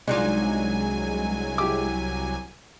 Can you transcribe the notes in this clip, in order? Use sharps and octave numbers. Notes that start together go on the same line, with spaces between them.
C2 F#3 G#3 D4 D#4 F4 G#5
E4 G4 D6